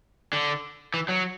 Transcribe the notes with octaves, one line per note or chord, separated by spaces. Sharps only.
D3
E3
F#3